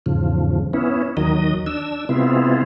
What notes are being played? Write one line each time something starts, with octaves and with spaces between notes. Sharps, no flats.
E2 G#2 C#3 F3
B3 C#4 E4
D#2 D#3 F#3 D#5
D4 E6
C3 G#3 B3 C4 E4 F4